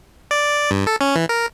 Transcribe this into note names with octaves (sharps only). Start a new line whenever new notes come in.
D5
G2
A4
C#4
E3
A#4